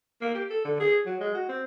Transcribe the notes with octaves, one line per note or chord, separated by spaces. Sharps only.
A#3
G4
A4
D3
G#4
F#3
G#3
F#4
C4